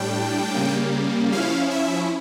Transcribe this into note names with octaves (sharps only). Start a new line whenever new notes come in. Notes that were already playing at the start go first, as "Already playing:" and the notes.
Already playing: A2 G3 D4 G5
C#3 G3 A#3
F3 C#4 E4 F5
E5